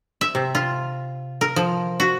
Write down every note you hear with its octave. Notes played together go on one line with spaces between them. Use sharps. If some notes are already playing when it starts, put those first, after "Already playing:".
E5
C3
F4
A#4
F3
F#4